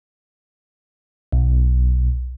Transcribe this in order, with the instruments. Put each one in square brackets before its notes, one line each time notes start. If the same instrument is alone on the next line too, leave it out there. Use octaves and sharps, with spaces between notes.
[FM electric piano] B1